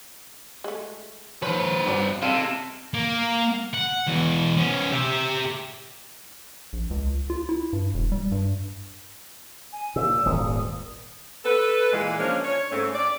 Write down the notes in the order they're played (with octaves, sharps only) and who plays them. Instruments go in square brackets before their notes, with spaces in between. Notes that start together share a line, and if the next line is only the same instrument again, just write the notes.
[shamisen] G#3 A3
[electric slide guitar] D#3 F3 [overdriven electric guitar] C4 B4 [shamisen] C#5
[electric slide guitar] G2 [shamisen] D#3 F#3 D4
[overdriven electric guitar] C3 [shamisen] G#3 F5 [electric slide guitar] E4 F4 A4
[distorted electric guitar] A#3
F#5
B2 E3
B3 C#4
G4 E5
[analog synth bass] A#1
C#2
F4
E4
G2
E1
G3
G2
[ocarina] G#5
[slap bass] A#2 [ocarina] E6
[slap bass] D#1 G#1 A#2 [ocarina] D#6
[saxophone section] A4 B4
A#2 E3 G#3
F3 A#3 C#4 D4
C#5
G#2 A3 C4 C#4
D5